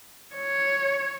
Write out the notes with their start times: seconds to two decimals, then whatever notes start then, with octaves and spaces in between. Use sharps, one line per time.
0.35 C#5